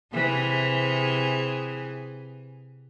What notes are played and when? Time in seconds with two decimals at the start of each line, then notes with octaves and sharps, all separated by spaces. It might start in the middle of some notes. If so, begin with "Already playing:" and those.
0.12 C3 E3 G#4